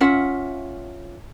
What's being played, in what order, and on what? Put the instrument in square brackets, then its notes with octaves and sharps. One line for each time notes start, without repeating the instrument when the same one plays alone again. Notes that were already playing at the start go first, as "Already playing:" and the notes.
[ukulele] C#4 F4 E5 F#5